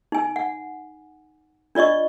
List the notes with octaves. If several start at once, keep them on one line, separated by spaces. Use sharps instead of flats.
D#4 G#5
F#5
D4 F4 D5 D#5 C#6